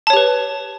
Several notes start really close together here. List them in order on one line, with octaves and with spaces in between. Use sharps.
A5 C#5 G4 B4